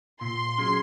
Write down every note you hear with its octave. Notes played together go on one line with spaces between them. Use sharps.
A#2 C6
F#3 C#4 G#4